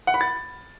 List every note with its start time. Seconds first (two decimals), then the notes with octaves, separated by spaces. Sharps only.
0.07 F#5
0.14 B5
0.21 A6